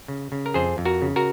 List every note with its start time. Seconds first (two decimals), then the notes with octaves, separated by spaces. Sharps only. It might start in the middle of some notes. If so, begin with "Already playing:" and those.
0.08 C#3
0.32 C#3
0.46 A#4
0.54 F2 G#4 C5
0.78 F2
0.85 F#4 A#4
1.02 C#3
1.16 F#4 A#4